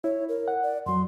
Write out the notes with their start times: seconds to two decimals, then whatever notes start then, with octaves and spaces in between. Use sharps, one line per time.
0.04 E4 C#5
0.29 A#4
0.48 F#5
0.63 D5
0.86 F2 F#3 C6